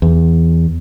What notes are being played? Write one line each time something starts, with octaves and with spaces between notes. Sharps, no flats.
E2